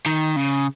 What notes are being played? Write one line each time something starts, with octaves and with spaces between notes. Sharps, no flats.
D#3
C#3